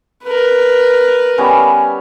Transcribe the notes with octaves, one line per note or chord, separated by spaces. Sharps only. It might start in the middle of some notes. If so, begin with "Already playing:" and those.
A#4 B4
G3 B3 C#4